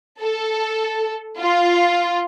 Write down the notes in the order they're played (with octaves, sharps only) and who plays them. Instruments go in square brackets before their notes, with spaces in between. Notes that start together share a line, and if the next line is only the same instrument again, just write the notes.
[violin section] A4
F4